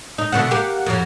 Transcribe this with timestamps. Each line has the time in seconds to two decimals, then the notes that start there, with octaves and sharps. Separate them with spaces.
0.18 D#4
0.32 B2 D3 E3 F#5
0.51 A#3 G4
0.86 F2 F3 F#3